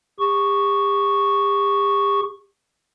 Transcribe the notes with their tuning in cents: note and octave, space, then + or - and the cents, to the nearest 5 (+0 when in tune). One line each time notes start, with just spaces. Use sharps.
G4 +40 C#6 +0